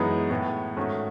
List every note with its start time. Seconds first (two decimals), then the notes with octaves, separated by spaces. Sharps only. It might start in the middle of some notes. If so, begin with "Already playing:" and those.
Already playing: F#2 E3 G#3 B3 D#4
0.30 A2 G#3 B3
0.77 G#2 D#3 A3 C#4 F#4